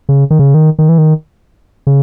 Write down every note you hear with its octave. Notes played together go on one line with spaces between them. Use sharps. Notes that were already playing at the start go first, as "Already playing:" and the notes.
C#3
D#3
C#3
D#3
D#3
E3
D#3
C#3